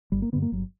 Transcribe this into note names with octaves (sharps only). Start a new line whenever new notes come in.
G1 G3
A#3
G2 D3 B3
A#3
G1 F#3